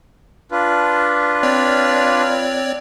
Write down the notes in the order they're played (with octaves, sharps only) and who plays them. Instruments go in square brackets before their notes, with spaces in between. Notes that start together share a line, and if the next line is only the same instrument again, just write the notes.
[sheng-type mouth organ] D4 F4 B4
[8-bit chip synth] C4 C#5 D5